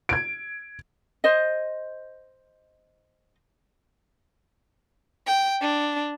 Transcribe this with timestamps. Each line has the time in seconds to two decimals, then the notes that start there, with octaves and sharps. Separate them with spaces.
0.09 G#6 D7
1.24 C5 D#5
5.26 G5
5.61 D4